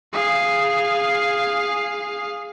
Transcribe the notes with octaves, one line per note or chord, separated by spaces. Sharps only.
G#4 F5